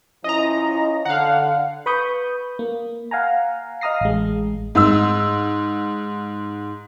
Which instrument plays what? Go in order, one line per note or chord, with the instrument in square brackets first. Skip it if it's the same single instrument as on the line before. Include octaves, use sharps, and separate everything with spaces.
[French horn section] F3 C#4 E4 [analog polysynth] D#5 A#5
[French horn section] D3 [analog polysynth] F5 F#5
[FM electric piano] B4 B5 C#6 D#6 G6
A#3
F5 F#5 G#5 A#5
D#5 F5 A#5 D#6 A#6 C7
A1 G#3
[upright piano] G#2 E6